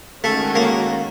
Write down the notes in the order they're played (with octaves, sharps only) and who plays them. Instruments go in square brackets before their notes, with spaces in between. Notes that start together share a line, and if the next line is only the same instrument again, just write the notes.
[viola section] D#3 G#3 C#4 F#4 A4 [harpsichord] A3
[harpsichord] A#3